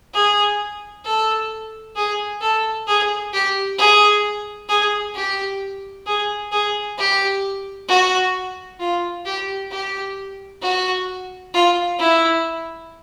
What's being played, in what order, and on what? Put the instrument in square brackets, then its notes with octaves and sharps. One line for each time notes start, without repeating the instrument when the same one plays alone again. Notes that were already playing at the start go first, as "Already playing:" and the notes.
[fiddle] G#4
A4
G#4
A4
G#4
G4
G#4
G#4
G4
G#4
G#4
G4
F#4
F4
G4
G4
F#4
F4
E4